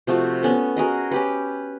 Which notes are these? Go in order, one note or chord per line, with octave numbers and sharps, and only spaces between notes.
C3 F3 A3 F#4
B3 C#4 A4
F#4 G#4 A#4 D#5
C#4 G4 B4